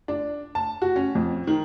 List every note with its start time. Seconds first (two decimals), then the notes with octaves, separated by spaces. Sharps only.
0.08 D4
0.55 A5
0.82 F#4
0.96 C#4
1.15 F2
1.47 D#3